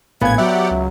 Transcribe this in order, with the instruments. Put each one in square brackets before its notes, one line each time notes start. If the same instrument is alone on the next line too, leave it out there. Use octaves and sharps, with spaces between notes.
[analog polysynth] A#1 G#6 [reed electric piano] A2 G#5 [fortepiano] B3 [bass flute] F5
[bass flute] F#3 [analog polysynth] G4 D5 F#5 [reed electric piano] E5
[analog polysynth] C#2